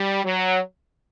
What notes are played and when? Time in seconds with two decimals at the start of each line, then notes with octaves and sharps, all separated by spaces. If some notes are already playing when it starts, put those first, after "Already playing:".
Already playing: G3
0.25 F#3